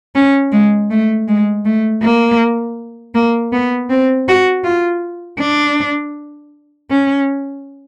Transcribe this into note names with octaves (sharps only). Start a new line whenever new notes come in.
C#4
G#3
A3
G#3
A3
A#3
A#3
B3
C4
F#4
F4
D4
C#4